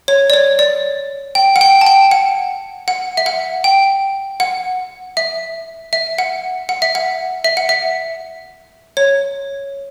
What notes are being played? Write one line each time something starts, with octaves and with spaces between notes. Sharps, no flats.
C#5
D5
C#5
D5
G5
F#5
G5
A5
G5
F#5
F#5
E5
F#5
G5
F#5
E5
E5
F#5
F#5
E5
F#5
E5
F#5
E5
C#5